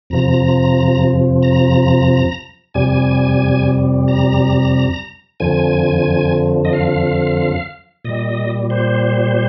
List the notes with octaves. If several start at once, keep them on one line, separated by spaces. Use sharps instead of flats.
F2 C3 F3 A#5
A#5
F2 C3 G3 G#5
A#5
F2 D3 F3 G#5
D#5
F5
A#2 G3 D#5
C5